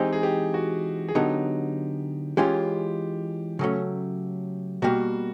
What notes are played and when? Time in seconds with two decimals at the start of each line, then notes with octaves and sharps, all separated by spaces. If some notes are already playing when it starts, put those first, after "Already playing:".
Already playing: E3 G#3 C4 D#4 G4
0.13 G#4
0.23 G4
0.54 F#4
1.09 G#4
1.15 D3 F#3 B3 D#4 G4
2.37 E3 G#3 C#4 F4 G4
3.59 C#3 F#3 A3 C#4
4.82 B2 G3 A#3 F#4